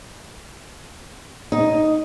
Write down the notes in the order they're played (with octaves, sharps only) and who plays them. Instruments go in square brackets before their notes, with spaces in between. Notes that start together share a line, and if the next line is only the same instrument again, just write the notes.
[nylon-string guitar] D#4